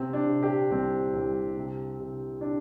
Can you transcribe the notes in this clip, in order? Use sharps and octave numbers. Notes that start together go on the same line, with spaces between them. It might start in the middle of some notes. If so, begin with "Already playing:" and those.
Already playing: C3 C4
D4
C3
G4
C2 C4
C2
C3
C3
D4